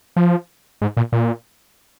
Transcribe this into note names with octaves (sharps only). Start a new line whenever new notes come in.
F3
G#2
A#2
A#2